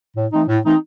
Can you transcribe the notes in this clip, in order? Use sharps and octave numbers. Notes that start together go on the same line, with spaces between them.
A2
E3 A3 C4 D#4
A2
E3 A3 C4 D#4